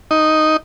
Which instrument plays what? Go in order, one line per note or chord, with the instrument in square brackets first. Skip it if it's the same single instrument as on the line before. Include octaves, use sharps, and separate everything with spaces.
[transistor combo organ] D#4